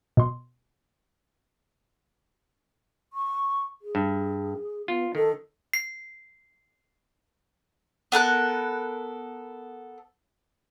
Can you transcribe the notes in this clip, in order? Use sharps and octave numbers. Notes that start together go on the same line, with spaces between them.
B2 C6
C#6
G#4
G2
B3 F4
D#3 A4
C7
B3 A4 A#4 F#6